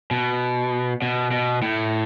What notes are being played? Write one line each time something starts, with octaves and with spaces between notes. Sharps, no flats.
B2
B2
B2
A2